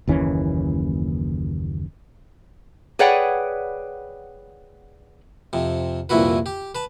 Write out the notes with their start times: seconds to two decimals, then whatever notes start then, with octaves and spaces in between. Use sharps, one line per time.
0.08 F#1 D#2 E3 C#4
2.99 G#4 B4 C#5 D5 F#5 G5
5.53 F2 C3
6.09 C2 F2 A#2 E4 F#4 B4
6.46 G4
6.75 B4 A5